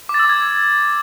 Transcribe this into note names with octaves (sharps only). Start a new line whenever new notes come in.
D6
A6
E6
D6
G#6